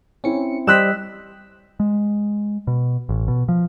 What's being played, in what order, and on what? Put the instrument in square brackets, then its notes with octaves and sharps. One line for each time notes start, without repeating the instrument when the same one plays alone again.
[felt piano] C4 E4 [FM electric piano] C#4 C#7
[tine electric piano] G3 [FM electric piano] C5 D#5 G5 [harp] E6 F#6 B6
[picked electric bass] G#3
B2
A1
B2
F3